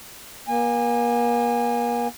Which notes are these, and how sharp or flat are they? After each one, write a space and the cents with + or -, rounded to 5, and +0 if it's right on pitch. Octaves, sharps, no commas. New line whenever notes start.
A#3 +40 G#5 -25